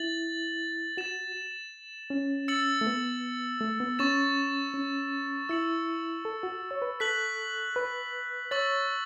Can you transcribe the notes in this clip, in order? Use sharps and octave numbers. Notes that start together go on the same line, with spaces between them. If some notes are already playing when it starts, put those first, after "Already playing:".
Already playing: E4 A6 F#7
F#4 A6 E7
C#4
E6 A6 C#7 F#7
A3
B3
A3
B3
C#4 C#6 A6 E7
C#4
E4 E6 C#7 F#7
A4
F#4
C#5
B4
A4 F#6 B6 F#7
B4
C#5 C#6 E6 A6 F#7